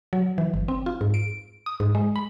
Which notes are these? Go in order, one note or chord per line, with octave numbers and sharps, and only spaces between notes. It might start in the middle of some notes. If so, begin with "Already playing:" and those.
F#3
E3
G1
C4
F4
G#2
D7
D#6
G#2
G#3
B5